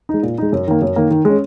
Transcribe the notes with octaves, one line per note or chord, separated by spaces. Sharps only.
G#3 D#4
A#2
G#3 D#4
F#2
D#3 A#3
F#2
D#3 A#3
D#3
G#3 C#4